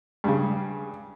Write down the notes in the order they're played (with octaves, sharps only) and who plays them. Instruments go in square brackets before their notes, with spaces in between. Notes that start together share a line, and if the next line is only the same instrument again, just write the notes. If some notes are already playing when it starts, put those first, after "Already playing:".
[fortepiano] G2 C#3